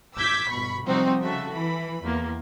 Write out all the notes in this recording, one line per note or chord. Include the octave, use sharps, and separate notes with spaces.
D6 E6 G6 G#6 B6
G1 B2 B5 C#6
C3 F3 G3 C4 D#4 F#4
C#3 F#4 A4 E5
E3 B5
E2 A#3